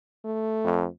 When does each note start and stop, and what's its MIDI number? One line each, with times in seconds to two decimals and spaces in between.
0.25 0.90 57
0.65 0.87 41